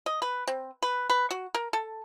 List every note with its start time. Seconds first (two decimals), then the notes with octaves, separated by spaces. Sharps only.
0.06 D#5
0.22 B4
0.47 C4
0.83 B4
1.10 B4
1.31 F#4
1.55 A#4
1.73 A4